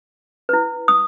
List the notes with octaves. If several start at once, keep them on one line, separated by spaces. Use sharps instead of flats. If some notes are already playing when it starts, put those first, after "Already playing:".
E4 B4
D#6